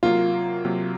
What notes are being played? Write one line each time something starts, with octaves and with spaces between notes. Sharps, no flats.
C3 F#3 A#3 F4
C3 F#3 A#3